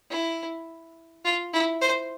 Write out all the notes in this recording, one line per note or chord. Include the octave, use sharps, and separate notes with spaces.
E4
F4
E4
C5